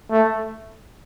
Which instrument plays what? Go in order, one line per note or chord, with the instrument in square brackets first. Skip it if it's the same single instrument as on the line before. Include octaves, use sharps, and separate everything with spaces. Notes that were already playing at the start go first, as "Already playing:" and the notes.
[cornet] A3